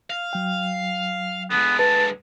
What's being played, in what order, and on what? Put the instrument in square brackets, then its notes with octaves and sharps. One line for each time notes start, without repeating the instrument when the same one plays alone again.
[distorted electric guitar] F5
[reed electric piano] F#3 G5
[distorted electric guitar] D3 G#3 [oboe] B3
[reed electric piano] B4 [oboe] A5